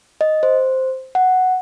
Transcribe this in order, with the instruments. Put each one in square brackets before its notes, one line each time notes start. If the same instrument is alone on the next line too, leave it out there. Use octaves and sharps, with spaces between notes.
[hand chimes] D#5
C5
F#5